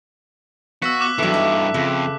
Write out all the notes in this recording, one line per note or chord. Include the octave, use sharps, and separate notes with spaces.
B2 B3 F#4 F5 E6 B6
D6 F#6
G2 D#3 E3 F#3 A3 A4
D#4 F#4 A5
F2 C#3 B4